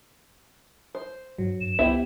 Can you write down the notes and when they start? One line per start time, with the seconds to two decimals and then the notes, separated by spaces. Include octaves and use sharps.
0.95 C5
1.38 G2 F#3
1.61 G2 E7
1.79 C2 B3 E4 G4 C5 E5